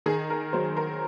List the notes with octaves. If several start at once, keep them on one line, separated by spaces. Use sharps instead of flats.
D#3 G#4
A#4
F#3 C5
A#4